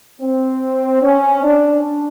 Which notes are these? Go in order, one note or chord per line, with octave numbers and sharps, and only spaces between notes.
C4
C#4
D4